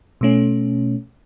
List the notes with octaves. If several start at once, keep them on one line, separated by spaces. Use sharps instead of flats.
B2 A3 C#4